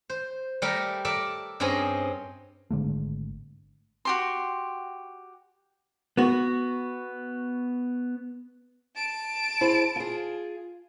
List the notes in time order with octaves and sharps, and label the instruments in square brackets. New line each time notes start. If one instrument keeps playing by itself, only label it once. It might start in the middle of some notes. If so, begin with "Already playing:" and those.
[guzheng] C5
G3 A3 G4 A4 A#4
A4 A#4 D5 E5 A5
G2 C4 C#4 G#4 D#5
[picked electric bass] G#1 D3 G#3 A3
[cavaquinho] F#4 G4 C6
[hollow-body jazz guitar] B3 F#4
[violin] A5 D7
[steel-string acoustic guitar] E4 G#4 C5
F4 G#4